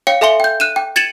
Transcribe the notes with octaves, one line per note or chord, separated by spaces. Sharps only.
C#5 F5 G5 C#7
A4 E5 G#5 C6 C#7 G7
G5 G6
F#6 D#7 E7
G5
G#6 A6 C#7 D#7 E7 F#7